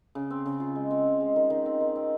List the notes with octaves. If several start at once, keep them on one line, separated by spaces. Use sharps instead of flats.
C#3
C4
C#3
F4
G#3
C4
F4
G#3
D#3
D#3
C4
D#3
C4